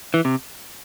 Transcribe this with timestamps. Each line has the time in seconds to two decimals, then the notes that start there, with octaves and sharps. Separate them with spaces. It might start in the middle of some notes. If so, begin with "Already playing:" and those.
0.14 E3
0.25 C3